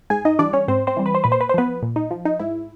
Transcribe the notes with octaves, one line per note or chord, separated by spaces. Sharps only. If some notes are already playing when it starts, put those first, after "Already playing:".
G#2 G#4 G#5
D#4 D#5
E3 G3 D4 D5
C#4 C#5
G#2 C4 C5
C4 C5
E3 G3
B4
C5
A#2 B4
C5
B4
C5
F3 B3 B4
A#2
D#4
F3
D#4
G#2 E4